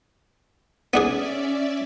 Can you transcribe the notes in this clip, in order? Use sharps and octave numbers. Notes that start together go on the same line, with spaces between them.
B3 C#4 D4 G#4 D5 E5